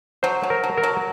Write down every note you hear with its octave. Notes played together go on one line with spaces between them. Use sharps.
F#3 C5
F#3
A#4
F#3
A#4
F#3